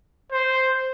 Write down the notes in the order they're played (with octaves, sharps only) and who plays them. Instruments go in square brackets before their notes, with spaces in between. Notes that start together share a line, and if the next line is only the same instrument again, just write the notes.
[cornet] C5